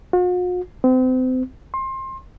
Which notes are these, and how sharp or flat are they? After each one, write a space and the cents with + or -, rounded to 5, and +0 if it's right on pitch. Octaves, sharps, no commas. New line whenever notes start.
F#4 -45
C4 -35
C6 +25